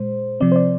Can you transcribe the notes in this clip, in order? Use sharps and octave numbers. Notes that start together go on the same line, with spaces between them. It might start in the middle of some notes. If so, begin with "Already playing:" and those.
Already playing: A#2 G#3 C5
C3 F3 C4 D5
C5
D5